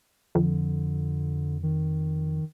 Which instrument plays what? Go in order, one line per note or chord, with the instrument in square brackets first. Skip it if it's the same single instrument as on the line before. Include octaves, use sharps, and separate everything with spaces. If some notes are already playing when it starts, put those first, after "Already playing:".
[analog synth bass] F2 [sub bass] D3
[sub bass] D#3